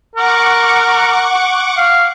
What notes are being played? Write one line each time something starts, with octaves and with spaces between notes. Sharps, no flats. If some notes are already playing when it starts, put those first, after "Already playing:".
A#4 F#5 C#6 D6
F5